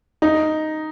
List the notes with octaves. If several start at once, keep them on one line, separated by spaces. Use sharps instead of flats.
D#4